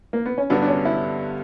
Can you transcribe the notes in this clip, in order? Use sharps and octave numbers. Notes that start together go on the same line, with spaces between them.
A#3
B3
C#4
G2 D3 G3 B3 D4 F#4
D4
C#4
E4